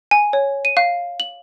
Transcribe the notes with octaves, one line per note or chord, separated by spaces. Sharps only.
G#5
C#5
D#7
F5
F#7